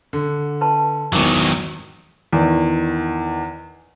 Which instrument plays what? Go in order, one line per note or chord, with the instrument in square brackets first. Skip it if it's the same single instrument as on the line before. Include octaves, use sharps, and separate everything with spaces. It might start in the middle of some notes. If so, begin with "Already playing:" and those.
[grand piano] D3
[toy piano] B4 A5 C6
[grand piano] G#1 E2 [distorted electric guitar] D#3 F#3 [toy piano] D6
[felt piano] E2 D#3